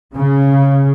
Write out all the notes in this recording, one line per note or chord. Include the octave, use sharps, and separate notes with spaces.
C#3